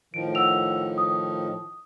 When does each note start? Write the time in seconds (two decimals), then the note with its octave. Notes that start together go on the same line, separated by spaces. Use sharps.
0.14 A2 D#3 F3 D7
0.35 F#5 E6 F7
0.98 D#6